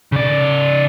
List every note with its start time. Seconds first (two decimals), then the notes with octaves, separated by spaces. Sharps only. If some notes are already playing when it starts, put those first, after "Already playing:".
0.12 C#3 D5